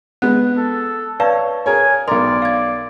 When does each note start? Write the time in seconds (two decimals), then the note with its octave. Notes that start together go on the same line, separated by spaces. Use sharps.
0.22 G#3 B3 F#6
0.57 A4
1.20 B4 C#5 D5 F5 A5
1.66 G#4 A#4 C#5 G#5
2.08 B1 A#4 D5 C6
2.42 F5 G#6